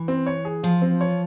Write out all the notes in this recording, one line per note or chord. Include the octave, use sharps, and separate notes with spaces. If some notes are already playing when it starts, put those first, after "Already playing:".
Already playing: E3
C4
C#5
G#4
F3 F4
C4
C#5